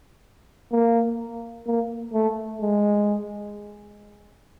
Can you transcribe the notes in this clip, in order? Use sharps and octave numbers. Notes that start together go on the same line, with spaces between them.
A#3
A#3
A3
G#3